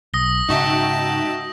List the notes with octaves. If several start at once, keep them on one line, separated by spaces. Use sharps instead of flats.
B1 D#6 A#6 G7
G#2 C#3 D#4 F#4 E5 G5 A5